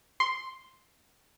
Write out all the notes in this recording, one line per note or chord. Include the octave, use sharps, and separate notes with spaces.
C6